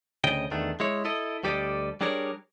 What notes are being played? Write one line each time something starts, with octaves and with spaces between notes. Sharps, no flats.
D2 C#3 D#5 G5
E2 D#3 A3 D4
G#3 E4 C#5
E4 A4 D#5
D2 G3 G4 A4 D5 D#5
G3 D4 G#4 A#4 C#5 D5